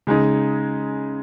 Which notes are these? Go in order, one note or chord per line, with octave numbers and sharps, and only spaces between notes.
C#3 G#3 D#4